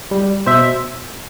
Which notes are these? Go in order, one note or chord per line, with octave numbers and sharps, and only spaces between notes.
G3
B2 C5 E5